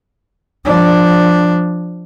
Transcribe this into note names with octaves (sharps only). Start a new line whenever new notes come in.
F3 D4